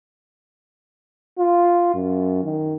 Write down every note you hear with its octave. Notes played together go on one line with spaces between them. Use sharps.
F4
F#2
D#3